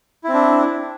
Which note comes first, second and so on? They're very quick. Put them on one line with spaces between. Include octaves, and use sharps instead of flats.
E4 C4 D4